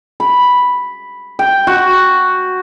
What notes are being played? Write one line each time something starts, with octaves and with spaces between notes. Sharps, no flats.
B5
G5
F#4